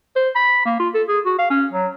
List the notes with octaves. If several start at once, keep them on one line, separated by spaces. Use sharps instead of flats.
C5
B5
A#3
F4
A4
G#4
F#4
F5
C#4
F#3